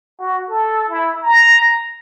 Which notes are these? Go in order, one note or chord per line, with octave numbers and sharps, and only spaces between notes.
F#4
A4
E4
A#5